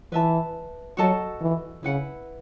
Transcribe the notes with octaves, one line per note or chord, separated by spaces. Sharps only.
E3 B4 E5 A5
F#3 F#4 A4 D#5 A5
E3
C#3 E4 B4 F#5